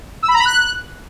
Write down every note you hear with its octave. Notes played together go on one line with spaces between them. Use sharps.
E6
B5
A#5
B5
F#6